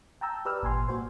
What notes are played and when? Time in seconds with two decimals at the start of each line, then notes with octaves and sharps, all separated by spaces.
0.21 G5 A5 A#5 E6 G6
0.45 G4 B4 D5 E6 F6
0.62 G#1 A#2 G#5 C6
0.88 A#3 F#4 C5